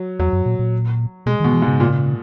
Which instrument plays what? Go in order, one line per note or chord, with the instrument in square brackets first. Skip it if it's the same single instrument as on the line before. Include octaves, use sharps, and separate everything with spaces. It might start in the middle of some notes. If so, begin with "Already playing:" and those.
Already playing: [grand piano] F#3
[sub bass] E2 [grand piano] F#3
[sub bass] F#2
A#2
A#2
[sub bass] B2 [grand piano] G#3
[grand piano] B2 [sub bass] D#3
[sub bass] E3
[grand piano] G#2
[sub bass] C#3
[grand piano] A#2